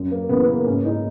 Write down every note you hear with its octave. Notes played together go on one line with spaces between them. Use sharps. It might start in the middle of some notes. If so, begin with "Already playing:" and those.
Already playing: F#2
A#3
C#3 E3 B3
A#3
B3
G#2 C#4
D#4